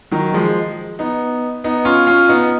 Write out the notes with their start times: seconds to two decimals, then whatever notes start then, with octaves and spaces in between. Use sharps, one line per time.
0.11 D#3 F#3
0.34 F3 G#3
0.99 B3 D#4
1.64 B3 D#4
1.85 C#4 F4
2.07 C#4 F4
2.29 B3 D#4